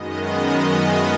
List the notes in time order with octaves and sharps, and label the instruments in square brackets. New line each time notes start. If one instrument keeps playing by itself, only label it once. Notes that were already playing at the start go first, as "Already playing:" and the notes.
Already playing: [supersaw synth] F#2 D#3 G#3 B3 D#5